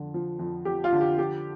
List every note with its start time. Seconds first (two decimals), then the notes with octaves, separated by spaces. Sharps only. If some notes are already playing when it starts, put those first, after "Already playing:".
Already playing: F2 D3
0.14 F3
0.39 F2
0.65 F2 G4
0.84 F4
0.92 D3
1.01 G4
1.18 F3 G4